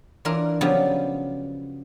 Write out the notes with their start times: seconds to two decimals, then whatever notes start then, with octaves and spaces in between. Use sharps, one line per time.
0.25 E3 D4 F4 A#4
0.61 C#3 F3 F#3 B3 D4 G4